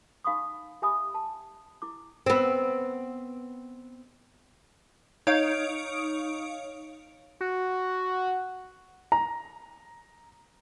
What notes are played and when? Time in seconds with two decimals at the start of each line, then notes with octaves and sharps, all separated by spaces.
0.25 D#4 F5 B5 C#6 D#6
0.82 G4 E5 G#5 B5 D#6
1.14 A5
1.82 E4 D6
2.26 B3 C4
5.27 D#4 C#5 F5 D7
7.41 F#4
9.12 A#5